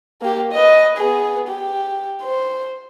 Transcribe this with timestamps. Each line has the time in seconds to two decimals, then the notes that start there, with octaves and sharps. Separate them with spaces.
0.21 A#3 G4
0.52 B4 D#5
0.98 B3 G#4
1.48 G4
2.22 C5